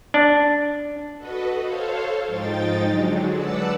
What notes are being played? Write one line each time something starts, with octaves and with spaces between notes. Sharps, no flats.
D4
F#4 A4 B4 D#5
A4 C5 C#5 F5
G#2 F3 D#4 G5 A6
D3 F#3 G#3
B4 D5 F#5 A5 E6